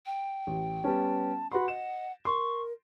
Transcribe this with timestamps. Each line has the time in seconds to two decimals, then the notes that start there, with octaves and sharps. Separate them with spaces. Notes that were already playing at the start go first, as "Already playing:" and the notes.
0.06 G5
0.47 A1
0.84 G3 B3 C#4 A5
1.52 F#4 B4 F#5 B5 C6
1.68 D#5 E7
2.25 A#4 C6 C#6